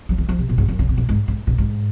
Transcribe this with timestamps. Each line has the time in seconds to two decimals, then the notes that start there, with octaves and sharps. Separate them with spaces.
0.09 F#3
0.18 D#3
0.29 F3
0.39 C3
0.49 A#2
0.58 G#2
0.68 F#2
0.79 C#3
0.89 C3
0.98 A#2
1.09 G#2
1.28 G#2
1.47 A#2
1.58 G#2